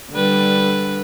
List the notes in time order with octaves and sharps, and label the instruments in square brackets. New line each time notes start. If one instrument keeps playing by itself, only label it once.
[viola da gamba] D3 G3 B4